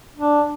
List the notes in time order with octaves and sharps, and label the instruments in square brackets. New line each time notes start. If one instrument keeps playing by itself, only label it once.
[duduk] D4